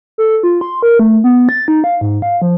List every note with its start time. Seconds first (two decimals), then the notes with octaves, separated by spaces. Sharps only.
0.18 A4
0.43 F4
0.61 C6
0.83 A#4
0.99 A3
1.24 B3
1.49 A6
1.68 D#4
1.84 F5
2.01 G#2
2.22 F5
2.42 F3